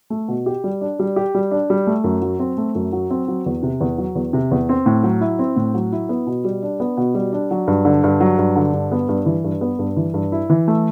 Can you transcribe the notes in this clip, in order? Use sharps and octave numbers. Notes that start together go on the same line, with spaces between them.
A3
B2
G4
G3
D4
G3
G4
G3
D4
G3
A3
F#2
F#3
C4
A3
F#2
F#3
C4
F#3
E2
C3
E2
F#3
E2
C3
E2
C4
A2
F#3
E4
C4
A2
F#3
E4
B3
B2
G3
D4
B3
B2
G3
D4
F#3
G2
D3
G2
F#3
G2
D3
G2
B3
G2
E3
G2
B3
G2
E3
G2
E4
E3
A3